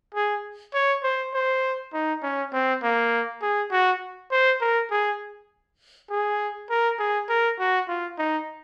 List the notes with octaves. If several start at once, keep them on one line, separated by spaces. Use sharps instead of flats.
G#4
C#5
C5
C5
D#4
C#4
C4
A#3
G#4
F#4
C5
A#4
G#4
G#4
A#4
G#4
A#4
F#4
F4
D#4